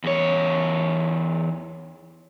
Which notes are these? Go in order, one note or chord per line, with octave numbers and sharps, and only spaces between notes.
E2 C#5